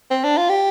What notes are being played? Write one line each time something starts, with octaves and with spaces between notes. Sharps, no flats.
C4
D4
F4
G4